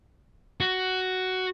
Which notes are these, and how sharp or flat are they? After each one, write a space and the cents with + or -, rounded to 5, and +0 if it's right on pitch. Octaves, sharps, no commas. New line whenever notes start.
F#4 +10